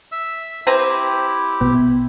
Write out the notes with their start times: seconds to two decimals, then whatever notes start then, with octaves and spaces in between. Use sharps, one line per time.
0.12 E5 E6
0.67 C4 E4 G4 B4 A#5
1.61 A#1 B2 B3